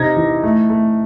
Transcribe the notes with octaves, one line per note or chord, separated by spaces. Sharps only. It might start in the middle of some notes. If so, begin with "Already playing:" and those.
Already playing: C3 D#4 G#6 A#6
E3
A3
A3